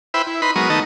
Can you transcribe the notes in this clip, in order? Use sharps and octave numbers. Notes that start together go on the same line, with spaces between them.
E4 B4 C5 E5 G5 B5
E4
D#4 B4 B5 C6
F#3 G#3 B3 A#4 C#6 D#6
D#3 A3 B3 D#4 D#5 A5